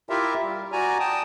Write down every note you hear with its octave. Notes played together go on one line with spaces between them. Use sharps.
E4 F4 G4 A#4 E5
G3
F#4 D5 G#5 A#5
G5 A5 D#6